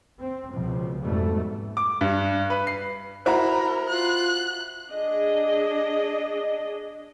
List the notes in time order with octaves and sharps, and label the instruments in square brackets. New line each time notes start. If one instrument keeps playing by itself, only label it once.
[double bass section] C4
C#2 B2 F3
F2 G#2 B2 G3 A3
[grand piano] D6
G2
B4
C7
[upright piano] E4 F#4 [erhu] A#4 [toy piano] C5 A#5 [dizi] B5
[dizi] F4 [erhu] F#6
[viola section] D4 G#4 D#5